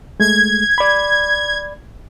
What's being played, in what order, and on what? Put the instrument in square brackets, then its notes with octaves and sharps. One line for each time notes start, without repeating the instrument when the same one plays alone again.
[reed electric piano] G#3 A3 [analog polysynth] G#6
[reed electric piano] D5 B5